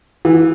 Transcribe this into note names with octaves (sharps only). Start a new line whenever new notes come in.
E3